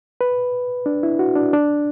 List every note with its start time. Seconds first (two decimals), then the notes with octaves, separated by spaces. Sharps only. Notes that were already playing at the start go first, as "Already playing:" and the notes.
0.21 B4
0.86 D4
1.03 E4
1.19 F#4
1.36 D4
1.53 D4